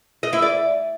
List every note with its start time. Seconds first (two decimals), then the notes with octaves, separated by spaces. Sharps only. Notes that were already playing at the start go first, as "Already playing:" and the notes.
0.23 D#5
0.33 E4
0.42 D5